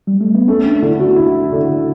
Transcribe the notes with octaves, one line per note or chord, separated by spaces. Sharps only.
G3
A3
B3
A3 C#4
D4
D3 E4
F#4
E4
D3